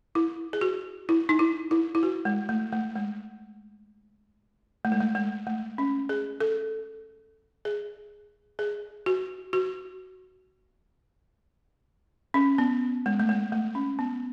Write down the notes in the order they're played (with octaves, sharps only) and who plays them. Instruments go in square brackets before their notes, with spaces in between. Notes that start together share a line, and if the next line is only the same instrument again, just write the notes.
[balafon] E4
G#4
F#4
E4
D#4
E4
E4
E4
F#4
G#3
A3
A3
G#3
A3
G#3
A3
G#3
A3
C#4
G#4
A4
G#4
G#4
F#4
F#4
C#4
B3
G#3
A3
G#3
A3
C#4
B3